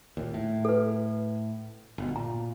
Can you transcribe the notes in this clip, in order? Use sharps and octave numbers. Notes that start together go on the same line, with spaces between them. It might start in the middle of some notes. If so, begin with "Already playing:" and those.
D#2 A#2
A2
A4 B4
G1 B2
A#2 A#5